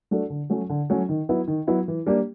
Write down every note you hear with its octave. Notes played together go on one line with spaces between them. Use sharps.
A3 D4 F#4 A4
D3
F#3 A3 C#4
D3
F#3 A3 C#4
D#3
F#3 B3 E4
D#3
F#3 B3 E4
E3
G3 A#3 D4 G4